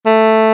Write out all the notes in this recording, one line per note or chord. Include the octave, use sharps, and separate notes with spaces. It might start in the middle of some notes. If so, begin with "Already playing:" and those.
A3